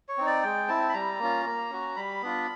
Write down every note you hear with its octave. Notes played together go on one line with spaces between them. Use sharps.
C#5
C4 D#4
D5
G#3 G5
C4 E4 A5
B5
G3 A#5
A#3 C#4 F4
A#3
C#4 F#4
G3 B5
B3 D4 F4